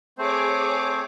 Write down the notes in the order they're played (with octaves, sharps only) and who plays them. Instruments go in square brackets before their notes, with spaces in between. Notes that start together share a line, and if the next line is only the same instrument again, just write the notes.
[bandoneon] A3 C4 C5 [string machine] G#4 C#5 D6